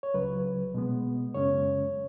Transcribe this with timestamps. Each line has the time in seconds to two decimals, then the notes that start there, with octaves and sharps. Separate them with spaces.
0.03 C#5
0.14 C#2 C#3 F#3 B4
0.74 B2 G#3 B3
1.35 F#2 C#3 G#3 C#4 C#5